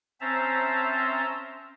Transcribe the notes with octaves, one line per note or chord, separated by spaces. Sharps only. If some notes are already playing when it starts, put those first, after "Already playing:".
C4 C#4 C5 E5 A5 A#5